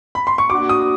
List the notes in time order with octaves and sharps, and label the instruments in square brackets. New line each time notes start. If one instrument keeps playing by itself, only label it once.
[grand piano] B5
C6
C#6
[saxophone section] A#3 D4 F#4 [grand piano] D6
[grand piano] D#6